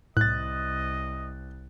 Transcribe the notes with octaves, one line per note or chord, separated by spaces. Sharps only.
C2 A2 D#5 F#6 A6